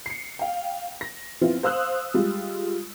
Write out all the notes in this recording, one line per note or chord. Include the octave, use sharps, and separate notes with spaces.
C7 C#7
F5 G5
A#6
F3 B3 C4 E4 F4
C5 F5 D#6 E6 F#6
G3 G#3 F4